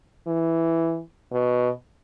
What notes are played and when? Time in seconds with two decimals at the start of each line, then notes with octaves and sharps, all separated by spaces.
0.27 E3
1.32 B2